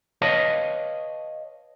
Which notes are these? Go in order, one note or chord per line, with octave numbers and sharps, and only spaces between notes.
B4 C#5 D#5 F5 A5